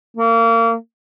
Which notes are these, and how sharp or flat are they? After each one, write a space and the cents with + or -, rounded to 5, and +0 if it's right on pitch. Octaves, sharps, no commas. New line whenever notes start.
A#3 -30